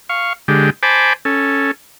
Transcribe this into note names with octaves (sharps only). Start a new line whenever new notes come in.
F5 C#6
D3 G#3 G4
C5 G#5 A5 B5 D6
C#4 A4